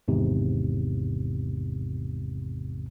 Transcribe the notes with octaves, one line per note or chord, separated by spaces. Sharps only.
G#1 E2 G#2 C3